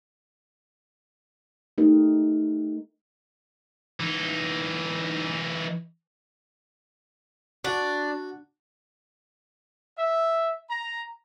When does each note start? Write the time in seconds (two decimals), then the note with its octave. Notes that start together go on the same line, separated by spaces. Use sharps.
1.78 A3 D#4 G4 A#4
4.00 E3 D#4
7.64 D4 F#4
9.98 E5
10.69 A#5